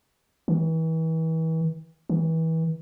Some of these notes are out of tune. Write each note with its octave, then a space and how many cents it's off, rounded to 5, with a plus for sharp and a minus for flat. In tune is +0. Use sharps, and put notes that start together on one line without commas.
E3 -35
E3 -30